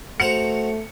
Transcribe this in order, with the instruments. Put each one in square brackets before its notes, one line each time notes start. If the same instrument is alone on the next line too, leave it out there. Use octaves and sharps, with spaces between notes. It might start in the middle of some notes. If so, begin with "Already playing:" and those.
[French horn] A3 [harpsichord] F#4 C5 A#5 [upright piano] C#7 F7